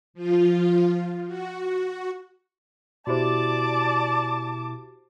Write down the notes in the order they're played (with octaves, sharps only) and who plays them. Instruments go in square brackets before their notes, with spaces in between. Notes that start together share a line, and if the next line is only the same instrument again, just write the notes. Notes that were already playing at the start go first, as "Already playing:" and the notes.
[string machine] F3 F4
F#4
[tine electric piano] B2 E4 [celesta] F#4 G4 C5 [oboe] D5 [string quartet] A5 D6